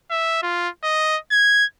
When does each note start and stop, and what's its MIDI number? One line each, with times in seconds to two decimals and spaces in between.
0.11 0.42 76
0.42 0.69 65
0.83 1.17 75
1.31 1.65 92